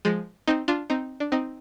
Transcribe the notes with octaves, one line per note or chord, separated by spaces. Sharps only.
F3 G#3
C4 D#4
D4 F4
C4 D#4
D4
C4 D#4